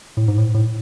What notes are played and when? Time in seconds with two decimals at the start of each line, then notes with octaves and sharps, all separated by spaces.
0.17 A2
0.28 G#2
0.38 A2
0.54 A2